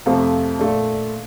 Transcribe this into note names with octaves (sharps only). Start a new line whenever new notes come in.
F2 C3 F3 A3
A#2 A3 D4